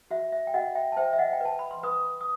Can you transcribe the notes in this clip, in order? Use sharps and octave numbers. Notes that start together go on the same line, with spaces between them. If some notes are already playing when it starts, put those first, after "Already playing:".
F#4 E5
E5
G5
F#4 D#5 F#5
E5 G5
A5
C5 E5 G5
E5
D#5 F#5
G5
B4 A5
B5
C6
B4 B5 D#6
D#6